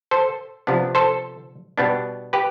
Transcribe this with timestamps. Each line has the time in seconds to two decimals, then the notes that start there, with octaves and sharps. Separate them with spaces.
0.11 A4 C5
0.67 C3 F3 B3 D4
0.95 A4 C5
1.78 B2 G3 B3 D4
2.33 G4 B4